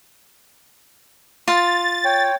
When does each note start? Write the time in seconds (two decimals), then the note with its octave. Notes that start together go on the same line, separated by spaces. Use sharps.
1.48 F4 A6
2.05 C#5 G5